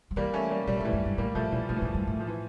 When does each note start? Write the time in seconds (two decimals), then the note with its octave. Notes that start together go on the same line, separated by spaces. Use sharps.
0.11 F3
0.16 E3 G3 A#3
0.34 A3 C#4
0.51 G3 A#3
0.67 A#2 G3
0.77 A3
0.80 A2 E3 G3
0.93 G2
1.06 G2
1.18 A2 G3 A#3
1.35 A#2 F3 A3
1.52 A#2 E3 G3
1.69 A2 F3
1.76 E3
1.82 A2 F3
1.94 G2
2.07 A2
2.20 F3
2.27 E3